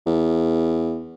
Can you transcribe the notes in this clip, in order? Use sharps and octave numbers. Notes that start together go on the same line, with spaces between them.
E2